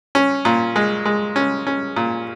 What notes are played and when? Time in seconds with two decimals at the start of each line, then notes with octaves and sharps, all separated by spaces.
0.15 C#4
0.45 A#2
0.76 G#3
1.05 G#3
1.36 C#4
1.67 C#4
1.96 A#2